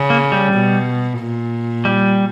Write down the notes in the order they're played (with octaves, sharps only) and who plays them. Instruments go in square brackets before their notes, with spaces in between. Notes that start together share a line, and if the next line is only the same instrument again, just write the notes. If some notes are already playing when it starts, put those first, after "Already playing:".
Already playing: [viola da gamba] C#3
[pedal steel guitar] A#3
G3
[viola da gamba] B2
A#2
[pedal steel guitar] G3